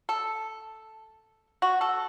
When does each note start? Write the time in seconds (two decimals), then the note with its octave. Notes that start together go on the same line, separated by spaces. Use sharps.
0.09 A4
1.62 F#4
1.81 A4